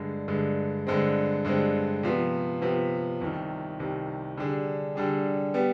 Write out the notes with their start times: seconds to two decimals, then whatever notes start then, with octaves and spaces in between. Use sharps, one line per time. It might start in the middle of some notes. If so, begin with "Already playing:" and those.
Already playing: G2 D3 G#3
0.28 G2 D3 G#3
0.87 G2 D3 G#3 C4
1.45 G2 D3 G#3 C4
2.03 C3 F3 B3
2.62 C3 F3 B3
3.21 C2 C3 D#3
3.79 C2 C3 D#3
4.38 D3 G3 D4 G#4
4.95 D3 G3 D4 G#4
5.54 G3 B3